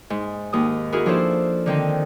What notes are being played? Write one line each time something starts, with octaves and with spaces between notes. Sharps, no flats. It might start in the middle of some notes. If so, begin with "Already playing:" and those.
G#2
D#2 D#6
E4 F#4 G#4 A#4
F3 D4 F4 A4 C5
D3 D#3 C4 D#4